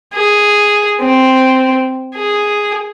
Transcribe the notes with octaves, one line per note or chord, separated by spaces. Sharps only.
G#4
C4
G#4